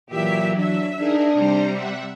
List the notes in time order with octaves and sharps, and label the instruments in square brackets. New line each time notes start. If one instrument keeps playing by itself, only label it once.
[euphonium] A#2 [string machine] E3 F#3 [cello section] G4 E5
[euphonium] D4 [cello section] E5
[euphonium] D4 [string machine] D#4 G#4 A#4
[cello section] C3 G3 [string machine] C5 A#5
[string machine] E5 F#5